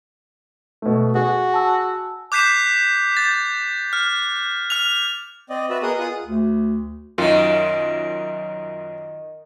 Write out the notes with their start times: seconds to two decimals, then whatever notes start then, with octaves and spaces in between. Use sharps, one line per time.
0.82 B2 A3
1.15 F#4 G#4
1.53 G#5 A5 E6
2.32 D6 F#6 G6 B6 C7 E7
3.17 G6 A6
3.93 F6
4.70 F6 F7
5.50 C4 D5 D#5
5.70 F#4 B4 D5 E5
5.82 B3 G#4 A#4 D#5 F#5 D#6
5.99 F4 G#4 F#5 D#6
6.23 D2
7.18 F#2 D#3 F4